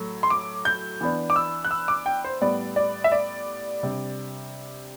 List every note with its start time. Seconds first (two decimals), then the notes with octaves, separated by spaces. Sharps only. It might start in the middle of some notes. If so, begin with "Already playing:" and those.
Already playing: A2 F#3 A3
0.23 C6
0.30 D6
0.65 G6
1.01 E3 B3 D4
1.30 D6
1.36 E6
1.65 F#6
1.71 E6
1.88 D6
2.06 G5
2.24 C5
2.42 A2 G3 B3 D5
2.76 D5
3.04 E5
3.12 D5
3.83 C3 G3 D4